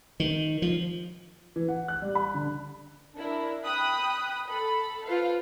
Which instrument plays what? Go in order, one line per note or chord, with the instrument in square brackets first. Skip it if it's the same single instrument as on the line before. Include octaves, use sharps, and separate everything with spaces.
[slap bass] D#3
F3
[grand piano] E3
F#5
F#6
G3
B5
D3
[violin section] D4 E4 A#4
G5 B5 D#6 F#6
A4 B5
F4 A4 B4 C5 F5